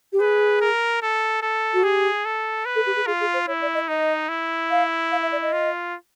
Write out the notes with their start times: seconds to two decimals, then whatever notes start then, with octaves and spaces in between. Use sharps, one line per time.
0.13 G4
0.20 G#4 B4
0.61 A#4
1.02 A4
1.42 A4
1.74 F#4
1.83 G4 G#4
2.25 A4
2.66 B4
2.76 A4
2.87 G4
2.96 G#4
3.07 F4 G#4
3.21 G#4
3.33 C5
3.47 E4 C#5
3.61 D5
3.74 D#5
3.88 D#4 D#5
4.29 E4
4.71 F5
5.12 F5
5.22 E5
5.32 D5
5.42 D#5
5.53 F4